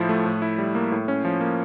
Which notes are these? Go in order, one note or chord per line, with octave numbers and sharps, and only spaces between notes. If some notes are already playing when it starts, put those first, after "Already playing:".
Already playing: A2 F3 E4
A3
A2
E4
G3
A#3
A2
C#4
F3
A#3